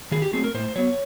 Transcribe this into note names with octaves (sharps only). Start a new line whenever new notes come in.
D#3 G#4
G4
F#3 A3 C4 G#4
A#4
A2 C5
F#3 B3 C#5